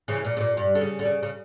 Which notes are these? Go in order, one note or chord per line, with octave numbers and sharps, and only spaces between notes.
C#3 E3
A#2
C#3
A#2
G2
D3
C#3
D3
C#3
C#3